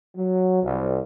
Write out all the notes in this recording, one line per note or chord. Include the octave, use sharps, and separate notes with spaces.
F#3
C2